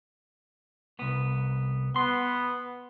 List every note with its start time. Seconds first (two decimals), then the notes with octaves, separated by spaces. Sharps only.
0.99 C2 B3
1.96 B3 C6